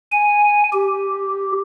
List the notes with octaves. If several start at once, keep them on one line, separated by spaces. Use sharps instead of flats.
G#5
G4